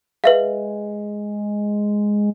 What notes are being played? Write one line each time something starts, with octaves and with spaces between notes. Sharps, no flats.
G#3 B4 E5 F5